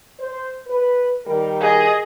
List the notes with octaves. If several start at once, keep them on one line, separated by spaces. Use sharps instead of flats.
C5
B4
D#3 G3 A#4
G#4 D#5